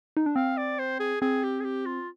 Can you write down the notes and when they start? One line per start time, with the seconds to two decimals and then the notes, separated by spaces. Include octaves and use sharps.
0.17 D#4
0.26 D4
0.36 C4 F5
0.57 D5
0.79 C5
1.00 G#4
1.21 C4 G#4
1.44 G4
1.60 G#4
1.64 G4
1.86 F4